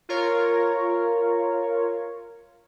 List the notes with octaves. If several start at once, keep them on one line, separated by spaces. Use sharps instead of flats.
F4 A#4 C#5